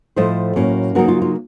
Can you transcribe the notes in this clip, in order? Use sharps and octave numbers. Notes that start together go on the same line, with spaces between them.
A2 F3 A3 C5 D#5
A2 F#3 A#3 C#4
C#3 F#3 A#3 D#4 F#4 A#4
F4
F4